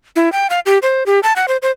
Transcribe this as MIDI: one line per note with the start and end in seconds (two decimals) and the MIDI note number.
0.16 0.32 64
0.32 0.47 79
0.50 0.60 77
0.66 0.78 67
0.82 1.04 72
1.06 1.20 67
1.23 1.33 81
1.36 1.46 78
1.48 1.57 72
1.62 1.71 72